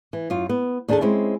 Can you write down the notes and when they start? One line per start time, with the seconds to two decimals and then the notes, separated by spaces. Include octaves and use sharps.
0.13 E3
0.30 F#2 F4
0.49 B3
0.88 D#2 D4 D#4 G#4 A4 A5
1.01 G#3 C4 C#4 E4